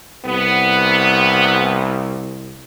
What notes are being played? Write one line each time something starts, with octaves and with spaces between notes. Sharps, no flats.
C2 B3